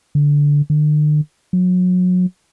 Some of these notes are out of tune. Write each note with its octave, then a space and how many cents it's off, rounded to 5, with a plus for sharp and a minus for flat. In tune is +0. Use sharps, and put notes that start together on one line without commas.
D3 -15
D3 +40
F#3 -30